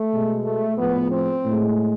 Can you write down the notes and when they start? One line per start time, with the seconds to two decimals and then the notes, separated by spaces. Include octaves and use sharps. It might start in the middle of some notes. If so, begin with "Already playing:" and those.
Already playing: A3
0.11 B2 G#3
0.44 A3
0.78 A2 F3 G#3 B3
1.11 C4
1.45 A2 G#3